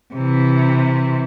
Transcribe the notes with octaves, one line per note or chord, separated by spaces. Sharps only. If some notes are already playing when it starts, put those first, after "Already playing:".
C3 E3